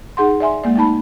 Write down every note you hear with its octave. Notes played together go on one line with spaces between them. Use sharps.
D#4 G#4 F#5 C6
D5 E5 G#5 C6
G#3 A#3 D5
A3 A#3 D#4 A5 B5